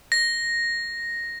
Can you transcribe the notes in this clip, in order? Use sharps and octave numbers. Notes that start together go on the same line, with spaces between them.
A#6